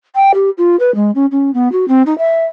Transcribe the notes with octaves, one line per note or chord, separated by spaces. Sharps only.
G5
G4
F4
B4
G#3
C#4
C#4
B3
F#4
C4
D#4
E5